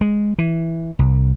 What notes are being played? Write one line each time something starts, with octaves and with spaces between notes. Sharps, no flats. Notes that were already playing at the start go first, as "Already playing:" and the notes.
G#3
E3
C2